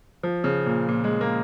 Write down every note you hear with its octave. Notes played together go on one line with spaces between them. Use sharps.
F3
C#3
A#2
A#2
G#3
A#3